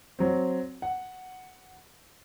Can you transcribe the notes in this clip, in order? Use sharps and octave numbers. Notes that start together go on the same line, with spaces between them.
F#3 C4
F#5